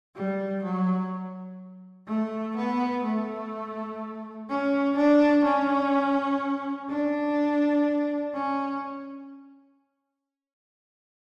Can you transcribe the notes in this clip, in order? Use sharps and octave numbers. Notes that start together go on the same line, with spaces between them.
G3
F#3
A3
B3
A3
C#4
D4
C#4
D4
C#4